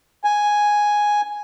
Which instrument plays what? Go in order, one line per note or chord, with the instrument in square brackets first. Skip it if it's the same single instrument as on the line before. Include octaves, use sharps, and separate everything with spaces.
[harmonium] G#5